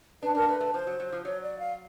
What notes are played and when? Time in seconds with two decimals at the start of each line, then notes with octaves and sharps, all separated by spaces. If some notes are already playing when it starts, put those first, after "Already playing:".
0.23 D4 B4
0.35 D4 A#4
0.42 A#3
0.49 A3 B4
0.61 A3
0.74 F3 C5
0.87 F#3
1.00 F#3
1.12 F3
1.25 F#3 C#5
1.42 D5
1.59 F5